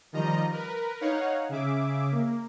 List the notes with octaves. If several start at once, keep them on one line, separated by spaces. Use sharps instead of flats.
D#3 F3 G3 D#5 A#5
A#4 B4
D#4 C#5 F5 F#5
C#3 G#4 E5 D6
A#3